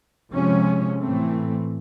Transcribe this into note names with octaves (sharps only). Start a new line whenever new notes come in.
C3 F3 G#3 C#4
A2 E3 A3 C4